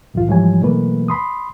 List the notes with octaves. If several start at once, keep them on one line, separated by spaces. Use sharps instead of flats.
C2 F#2 A2 E3 F4
G#2 E3 F3 G3 C#5 G#5
B2 E3 F#3 A3 A#3 B4
B5 C6 D#6